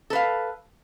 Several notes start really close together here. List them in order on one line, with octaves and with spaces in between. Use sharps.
A4 B4 F5